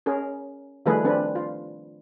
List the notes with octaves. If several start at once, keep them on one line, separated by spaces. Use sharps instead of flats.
C#4 G#4 A#4
D#3 F3 G3 A3 G#4 B4
C4 D4 B4
F4